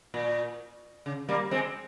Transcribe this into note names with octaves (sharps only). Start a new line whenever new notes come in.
A#2
C#3
G3 A#3
G#3 C4